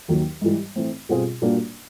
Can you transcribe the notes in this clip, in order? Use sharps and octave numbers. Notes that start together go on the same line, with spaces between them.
D#2 D#3 F#3
G#2 E3 G3
A2 E3 A3 C4
B2 G3 C4 F4 G#4
A#2 G3 A#3 D4 F#4